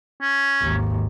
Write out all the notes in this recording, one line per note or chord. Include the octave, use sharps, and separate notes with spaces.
C#4
G#1 D#2